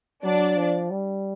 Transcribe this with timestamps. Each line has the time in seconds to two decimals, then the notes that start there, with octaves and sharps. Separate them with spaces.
0.24 F#3 D4 D5
0.57 F3
0.90 G3